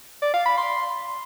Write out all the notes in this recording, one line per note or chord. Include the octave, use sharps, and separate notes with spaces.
D5
F5
B5
C6